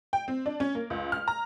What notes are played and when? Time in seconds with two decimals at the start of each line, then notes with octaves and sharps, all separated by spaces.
0.13 G5
0.28 C4
0.46 D4
0.60 C#4
0.75 A#3
0.90 C#2
1.12 F6
1.28 A#5